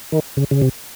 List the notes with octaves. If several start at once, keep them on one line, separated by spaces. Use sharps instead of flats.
D#3
C#3
C#3
C3